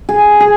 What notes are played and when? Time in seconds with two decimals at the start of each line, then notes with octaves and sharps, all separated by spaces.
0.09 G#4
0.40 G#4